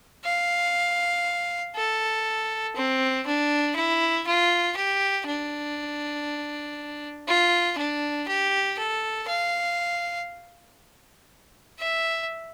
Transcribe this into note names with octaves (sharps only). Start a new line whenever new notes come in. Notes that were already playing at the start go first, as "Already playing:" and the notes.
F5
A4
C4
D4
E4
F4
G4
D4
F4
D4
G4
A4
F5
E5